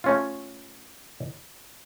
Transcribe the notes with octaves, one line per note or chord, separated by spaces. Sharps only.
A3 C#4 F4